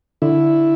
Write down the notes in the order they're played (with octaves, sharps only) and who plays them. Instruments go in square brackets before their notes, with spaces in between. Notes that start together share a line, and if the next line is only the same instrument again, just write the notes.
[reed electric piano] D3 [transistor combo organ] E4